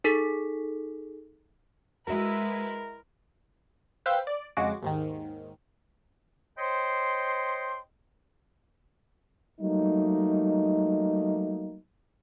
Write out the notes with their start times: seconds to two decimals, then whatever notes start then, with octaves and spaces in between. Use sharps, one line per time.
0.04 D#4 G#4 A4 B6
2.07 G#3 E4 F#4 A#4 B4 E5
4.06 B4 C5 F5 G5 C6 E6
4.27 D5
4.57 F2 C#3 G#3 F#4 D6
4.82 D#2 G#2 D#3
6.58 C5 C#5 D#5 G5 C6
9.60 F#3 G3 A3 A#3 D#4